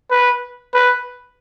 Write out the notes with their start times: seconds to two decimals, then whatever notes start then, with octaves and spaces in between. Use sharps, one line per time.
0.11 B4
0.74 B4